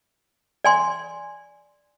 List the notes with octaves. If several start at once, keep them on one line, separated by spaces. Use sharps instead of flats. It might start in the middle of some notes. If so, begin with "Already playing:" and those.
D5 G#5 C6